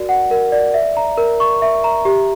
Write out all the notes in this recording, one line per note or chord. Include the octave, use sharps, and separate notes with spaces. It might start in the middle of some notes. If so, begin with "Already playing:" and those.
Already playing: F#4 A#4 D5
F#5
A#4
D5
E5
A#5
A#4
C#6
E5
A#5
G4